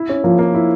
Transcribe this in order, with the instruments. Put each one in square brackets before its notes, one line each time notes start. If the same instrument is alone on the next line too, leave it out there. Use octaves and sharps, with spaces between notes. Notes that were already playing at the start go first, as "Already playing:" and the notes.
Already playing: [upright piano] E4
C#4
[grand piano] F3 [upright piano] A#3
[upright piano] A#3
E4